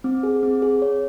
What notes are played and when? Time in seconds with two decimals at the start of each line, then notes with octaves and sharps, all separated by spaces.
0.04 C4
0.23 G#4
0.43 C4
0.62 G#4
0.82 C#5